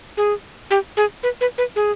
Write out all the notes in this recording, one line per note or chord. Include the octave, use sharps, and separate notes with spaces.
G#4
G4
G#4
B4
B4
B4
G#4